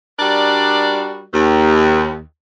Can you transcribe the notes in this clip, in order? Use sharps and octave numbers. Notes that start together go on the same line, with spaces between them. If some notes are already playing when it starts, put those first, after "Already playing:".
G3 D4 F#4 A#4 D5
D#2